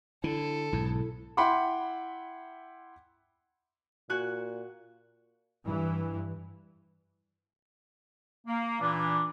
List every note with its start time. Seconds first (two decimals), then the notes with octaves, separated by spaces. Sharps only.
0.24 D3 E4 A4
0.73 B1 G#2 E4
1.37 E4 F#5 G5 B5 C6 D6
4.10 A#2 F#4 G#5 F#6
5.64 G2 E3
8.47 A#3
8.81 A#2 E3 D4
8.98 D4